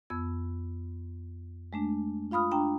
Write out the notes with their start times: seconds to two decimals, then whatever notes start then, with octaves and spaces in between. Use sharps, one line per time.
0.10 F2 B3 E6 G#6
1.73 G#3 A3 D4
2.31 F4 F5 B5 D#6 F6
2.51 D4 G5 A#5